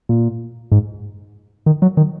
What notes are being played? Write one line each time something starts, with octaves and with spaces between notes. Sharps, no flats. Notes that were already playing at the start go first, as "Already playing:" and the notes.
A#2
G#2
D#3
F#3
D#3